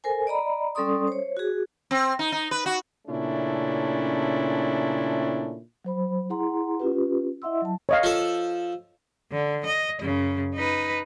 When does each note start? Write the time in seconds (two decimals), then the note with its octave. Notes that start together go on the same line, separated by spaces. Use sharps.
0.04 A4 A#4 C5 G#5
0.27 D5 D#5 A#5 B5
0.75 G3 C#4 A4 D5 C6 D#6
1.07 C5 C#5
1.37 F#4 G#4
1.91 C4
2.19 D#4
2.32 D#4
2.51 B4
2.66 F#4
3.08 A#2 C#3 A3 C#4 D4 E4
5.85 F#3 C5 B5
6.30 E4 G#4 F#5 A#5 C6
6.80 C#4 F4 G4 B4
7.42 E4 D#5 E5 F#5 C6 E6
7.62 F#3 A5
7.89 C#5 D#5 F5
8.03 F3 A4
9.32 D3
9.66 D#5
10.00 F#2 C#3
10.55 D#4 B4